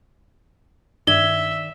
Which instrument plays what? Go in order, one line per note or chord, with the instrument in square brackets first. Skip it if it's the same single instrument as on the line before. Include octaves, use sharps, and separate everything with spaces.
[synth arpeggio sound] G2 G#6 [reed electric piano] D#3 D5 [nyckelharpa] E5 [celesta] G7